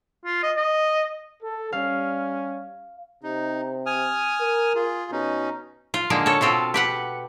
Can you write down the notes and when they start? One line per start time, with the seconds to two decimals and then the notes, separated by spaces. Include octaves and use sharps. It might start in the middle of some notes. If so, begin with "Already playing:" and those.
0.25 F4
0.43 D#5
0.57 D#5
1.42 A4
1.72 G3 C#4 F5
3.23 C3 D#4
3.86 G#5 D#6 F6
4.41 A#4
4.75 F4 G#4
5.12 B2 C#4 D#4
5.94 F4
6.10 D3 G#3 A#3
6.26 A4 C#5
6.41 B2 C4 F4 A4
6.74 G4 B4 F#5